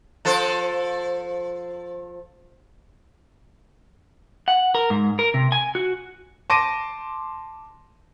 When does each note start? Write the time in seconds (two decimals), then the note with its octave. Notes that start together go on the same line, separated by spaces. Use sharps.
0.25 F3 A4 C5
4.48 F#5
4.75 A#4
4.90 G#2
5.19 A#4
5.34 C3
5.52 G#5
5.75 F#4
6.50 A5 C6 D6 A#6 D7 D#7